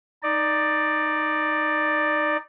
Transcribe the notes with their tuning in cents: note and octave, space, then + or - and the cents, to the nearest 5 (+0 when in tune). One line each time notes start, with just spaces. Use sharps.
D#4 +0 D5 +10